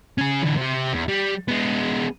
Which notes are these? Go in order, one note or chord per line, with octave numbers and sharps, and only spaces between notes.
C#4 G#4
D3 E3
C3 G4
E2
G3
G#3 B3